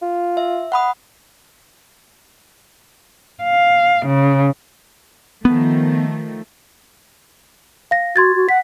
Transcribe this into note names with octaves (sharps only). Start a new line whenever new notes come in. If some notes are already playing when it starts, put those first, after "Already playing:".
F4
E5
F#5 B5 D#6
F5
C#3
D#3 F3 A3 B3
F5 A#6
F#4 C6 G#6 A6
F#4
F#5 B6